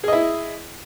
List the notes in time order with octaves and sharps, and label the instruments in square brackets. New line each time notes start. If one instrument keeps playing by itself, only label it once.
[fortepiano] G#4
D#5
E4